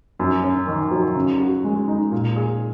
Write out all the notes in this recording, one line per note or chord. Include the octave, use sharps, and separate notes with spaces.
F#2
C#4
D#3
F#3
C#3
F#4
G#3
D#4
A#2
G#4